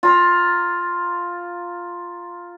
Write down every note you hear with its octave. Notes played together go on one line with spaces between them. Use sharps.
F4 A#5